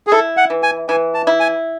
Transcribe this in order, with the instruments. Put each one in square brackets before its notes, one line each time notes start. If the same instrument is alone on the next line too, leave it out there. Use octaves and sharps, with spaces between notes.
[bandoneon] G#4
[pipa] E4 [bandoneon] A4
[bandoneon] F#5
[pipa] E3
[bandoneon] G#5
[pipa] E3 [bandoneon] G#5
[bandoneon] A5
[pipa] E4
[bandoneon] G#5